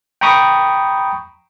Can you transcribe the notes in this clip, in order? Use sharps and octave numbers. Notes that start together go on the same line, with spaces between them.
G5 A#5 B5 C#6 D#6